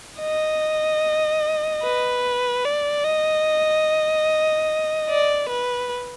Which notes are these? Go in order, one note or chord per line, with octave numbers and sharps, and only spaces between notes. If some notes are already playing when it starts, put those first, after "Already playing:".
D#5
B4
D5
D#5
D5
B4